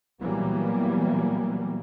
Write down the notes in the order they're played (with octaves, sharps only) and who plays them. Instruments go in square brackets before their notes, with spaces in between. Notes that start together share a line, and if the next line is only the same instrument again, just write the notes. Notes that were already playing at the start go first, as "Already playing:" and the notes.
[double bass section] A#2 E3 F#3 G3 A#3 B3